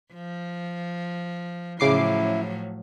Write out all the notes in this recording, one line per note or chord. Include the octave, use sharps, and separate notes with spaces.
F3
A2 C#3 F3 F#3 E4 D6 C7